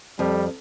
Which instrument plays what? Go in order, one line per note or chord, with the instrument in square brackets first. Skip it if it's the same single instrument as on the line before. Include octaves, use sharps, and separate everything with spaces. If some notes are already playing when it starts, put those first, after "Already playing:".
[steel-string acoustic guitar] F2 [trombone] G3